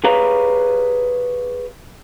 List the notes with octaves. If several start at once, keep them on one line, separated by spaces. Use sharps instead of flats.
G4 G#4 B4 C#5 F5 A#5